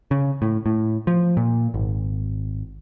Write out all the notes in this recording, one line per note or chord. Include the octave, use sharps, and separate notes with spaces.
C#3
A2
A2
F3
A#2
G#1